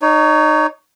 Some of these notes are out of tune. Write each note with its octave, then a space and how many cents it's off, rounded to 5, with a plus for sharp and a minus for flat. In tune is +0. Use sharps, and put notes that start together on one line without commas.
D#4 -20 C#5 +20